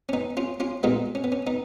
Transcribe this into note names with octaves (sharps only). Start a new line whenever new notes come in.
C#4
B3 D#4
C#4 F4
C#4 F4
B1 A#2 G#3 B3 D#4
C#4
B3
C#4
B3 D#4